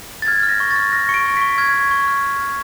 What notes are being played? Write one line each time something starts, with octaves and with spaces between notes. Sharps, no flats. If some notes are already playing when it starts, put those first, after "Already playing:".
A6
F6 G#6
F6
A#6
C#6
A6
F6
F6 A#6
C#6 C#7
D7
C#6
C#6 B6
F6 G#6
C#6
C#6
F6
F6
F6